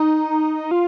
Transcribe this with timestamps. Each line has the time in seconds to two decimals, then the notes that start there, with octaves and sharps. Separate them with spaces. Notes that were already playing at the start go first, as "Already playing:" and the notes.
Already playing: D#4
0.71 F4